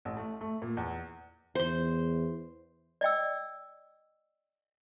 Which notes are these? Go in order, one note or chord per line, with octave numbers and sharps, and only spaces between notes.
A1
A3
A3
A#2
E2
E2 C5 C6
D5 D#5 G5 E6